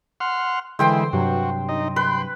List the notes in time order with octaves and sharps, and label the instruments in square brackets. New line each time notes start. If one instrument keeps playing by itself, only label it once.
[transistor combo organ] F#5 C6 F6
[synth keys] D3 E3 [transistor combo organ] G#3 E4 [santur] C5 G5 C6
[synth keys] G2 C3 F#3 [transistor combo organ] F#4
[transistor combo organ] D#4 D#5
[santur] B4 [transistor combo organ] G5 C6